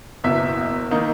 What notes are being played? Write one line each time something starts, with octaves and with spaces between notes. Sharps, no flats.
F#1 E2 B2 E5
D#3 A#3 D#4